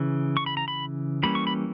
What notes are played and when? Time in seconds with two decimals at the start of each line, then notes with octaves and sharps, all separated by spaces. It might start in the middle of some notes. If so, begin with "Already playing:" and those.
Already playing: C#3 E3
0.37 C#6
0.46 B5
0.57 A#5
0.68 B5
1.23 E3 G3 A#3 C#4 B5
1.35 C#6
1.47 B5